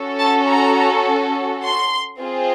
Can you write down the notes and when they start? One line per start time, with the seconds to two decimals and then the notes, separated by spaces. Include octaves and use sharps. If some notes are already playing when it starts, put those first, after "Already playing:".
Already playing: C#4 F#4 A4
0.19 A5
0.48 A#5
1.63 C6
2.20 C4 F4 G#4